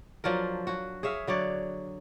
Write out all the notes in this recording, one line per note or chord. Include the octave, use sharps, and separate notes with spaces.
F3 F#3 D4 A#4
F#3 F#4
G#4 C#5 E5 F5
D3 F#3 C#5 D5